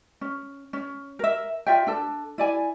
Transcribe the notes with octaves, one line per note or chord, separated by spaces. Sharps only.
C#4
C#4
A#4 E5
F4 D5 E5 G5
D4 A4 A5
E4 D5 G#5